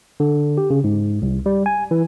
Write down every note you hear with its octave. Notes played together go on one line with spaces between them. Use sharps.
D3
G4
C#3
G#2
C2
G3
G#5
E3